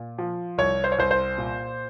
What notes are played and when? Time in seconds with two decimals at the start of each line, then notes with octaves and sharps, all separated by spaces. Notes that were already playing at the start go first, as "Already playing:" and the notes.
Already playing: A#2
0.18 F3
0.58 C2 C#5
0.84 C5
0.92 C#5
0.98 C2 C5
1.11 C5
1.38 A#2